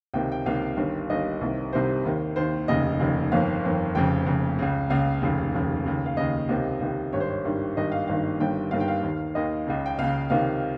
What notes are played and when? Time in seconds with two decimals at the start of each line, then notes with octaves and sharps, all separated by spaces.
0.14 C#2 C3 D#3 G5
0.32 G5
0.46 C#2 C3 D#3 F5
0.77 G1 G2 D#3
1.10 G1 G2 D#3 D#5
1.41 C2 C3 D#3
1.73 C2 C3 D#3 C5
2.05 D#2 D#3
2.36 D#2 D#3 C5
2.68 F1 D#2 C#3 D#5
3.00 F1 D#2 C#3
3.32 G1 F2 D#3 F5
3.64 G1 F2 D#3
3.95 F1 F2 C#3 G5
4.27 F1 F2 C#3
4.59 C#2 C#3
4.90 C#2 C#3 F5
5.22 F1 D#2 C#3
5.54 F1 D#2 C#3
5.86 D#2 C#3
6.06 F5
6.17 D#2 C#3 D#5
6.49 C#2 C3 D#3
6.81 C#2 C3 D#3
7.13 G#1 G2 D#3 C#5
7.20 C5
7.29 C#5
7.45 G#1 G2 D#3
7.77 G#1 G2 D#3 D#5
7.92 F5
8.08 G#1 G2 D#3 F5
8.40 G1 G2 D#3 G5
8.71 G1 G2 D#3 F5
8.80 G5
8.88 F5
9.03 D#2 D#3
9.35 D#2 D#3 D#5
9.67 C#2 C#3
9.86 G5
9.98 C#2 C#3 F5
10.30 C#2 C3 D#3 F5